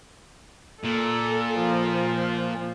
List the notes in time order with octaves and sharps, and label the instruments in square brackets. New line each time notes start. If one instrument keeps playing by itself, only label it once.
[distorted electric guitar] A#2 [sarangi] A4
[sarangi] F3